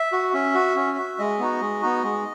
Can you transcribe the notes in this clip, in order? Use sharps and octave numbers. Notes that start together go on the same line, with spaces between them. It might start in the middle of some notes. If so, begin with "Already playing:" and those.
Already playing: E5
F#4
C#4 E5
F#4
C#4
F#4
G#3 D#5
B3 D#4 F#4
G#3
B3 D#4 F#4
G#3